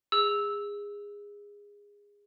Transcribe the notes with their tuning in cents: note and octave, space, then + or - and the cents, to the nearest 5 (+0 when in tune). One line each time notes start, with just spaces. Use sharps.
G#4 -20 E6 -10